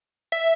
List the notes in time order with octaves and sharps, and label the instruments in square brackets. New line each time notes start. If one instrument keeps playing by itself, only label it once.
[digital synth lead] E5